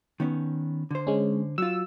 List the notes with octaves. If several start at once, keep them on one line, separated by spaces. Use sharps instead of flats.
D#3 B3 C#4
D3 C5
G#3 C#4
F#3 F4 E6